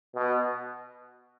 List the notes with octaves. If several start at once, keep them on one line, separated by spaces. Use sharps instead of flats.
B2